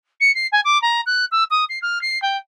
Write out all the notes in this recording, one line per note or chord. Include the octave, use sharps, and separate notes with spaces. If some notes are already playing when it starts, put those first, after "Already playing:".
C#7
C7
G#5
D6
A#5
F#6
E6
D#6
C7
F6
C7
G5